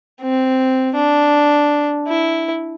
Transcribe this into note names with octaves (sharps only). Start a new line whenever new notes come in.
C4
D4
E4